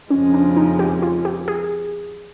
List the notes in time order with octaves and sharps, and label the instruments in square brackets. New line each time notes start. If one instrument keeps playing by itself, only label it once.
[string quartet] F2 C#3 F3 G#3 [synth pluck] C#4
[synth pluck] D4
D#4
G4
F4
G4
G#4